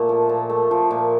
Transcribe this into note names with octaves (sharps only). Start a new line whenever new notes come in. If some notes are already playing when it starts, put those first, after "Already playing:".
Already playing: A#2 A3
F3
A#2
A3
F3
A#2